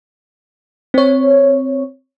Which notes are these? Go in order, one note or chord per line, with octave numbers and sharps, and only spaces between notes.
C4 C#5